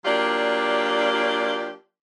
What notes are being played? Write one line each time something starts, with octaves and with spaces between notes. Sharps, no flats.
F#3 A#3 D4 F4 G4 D5